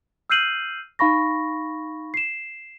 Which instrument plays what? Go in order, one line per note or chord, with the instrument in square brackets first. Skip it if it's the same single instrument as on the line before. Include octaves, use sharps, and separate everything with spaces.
[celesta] E6 F6 G6 C7 D#7 F#7
D#4 F5 B5 C#6 A#6
C7 E7